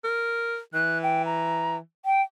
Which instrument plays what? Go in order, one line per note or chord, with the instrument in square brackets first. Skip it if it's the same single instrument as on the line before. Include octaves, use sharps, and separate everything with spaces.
[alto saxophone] A#4
[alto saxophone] E3 [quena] F#6
[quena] G5
A#5
G5